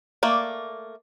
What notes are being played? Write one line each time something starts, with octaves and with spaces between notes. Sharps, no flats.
A3 A#3 D5